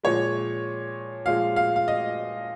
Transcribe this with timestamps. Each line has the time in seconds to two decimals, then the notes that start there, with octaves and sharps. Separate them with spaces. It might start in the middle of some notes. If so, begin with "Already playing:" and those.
0.03 A#2 F3 G#3 C#5
1.26 A#2 F3 G#3 F5
1.56 F5
1.76 F5
1.88 D#5